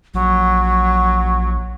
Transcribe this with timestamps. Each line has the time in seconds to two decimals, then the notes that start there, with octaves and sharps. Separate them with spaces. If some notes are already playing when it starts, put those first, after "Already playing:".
0.14 A#1 F#3